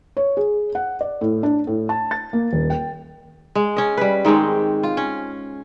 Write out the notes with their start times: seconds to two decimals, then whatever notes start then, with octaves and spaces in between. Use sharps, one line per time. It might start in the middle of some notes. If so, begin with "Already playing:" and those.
0.17 C#5
0.37 G#4
0.75 F#5
1.01 D5
1.21 A2
1.43 D4
1.67 A2
1.89 A5
2.11 A6
2.33 A#3
2.52 D#1
2.70 G5
3.55 G#3
3.76 C#4 D#5
3.97 G3 B4
4.25 G#2 D#3 G#3 C4
4.83 F4
4.97 C#4